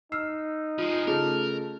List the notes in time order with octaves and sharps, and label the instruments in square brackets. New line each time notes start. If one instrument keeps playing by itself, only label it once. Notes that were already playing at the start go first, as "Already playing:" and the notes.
[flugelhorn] D#4 [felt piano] E6 [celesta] F6 C7
[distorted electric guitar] F3 G#3 [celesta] F4
[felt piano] C#3 A3 [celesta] F4 G#4 [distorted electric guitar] A#4